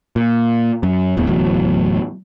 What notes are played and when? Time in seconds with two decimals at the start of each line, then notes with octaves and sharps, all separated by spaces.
0.16 A#2
0.83 F#2
1.17 D1 A1 E2
1.28 D1 E2 A2 F#3